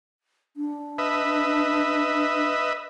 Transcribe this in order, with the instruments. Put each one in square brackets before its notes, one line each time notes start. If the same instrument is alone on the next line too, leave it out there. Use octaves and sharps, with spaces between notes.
[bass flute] D4
[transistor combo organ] B4 D#5 E5